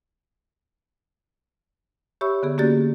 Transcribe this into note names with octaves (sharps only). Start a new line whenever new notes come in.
G4 C#5 E5 B5 C#6 E6
D3 B3 G#4
A#3 C#4 F#4 G4 D5 A6